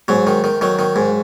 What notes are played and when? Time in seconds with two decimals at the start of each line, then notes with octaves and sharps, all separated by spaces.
0.08 G#2 F#3
0.27 D#3
0.44 D#3
0.61 D#3 F#3
0.79 D#3
0.96 G#2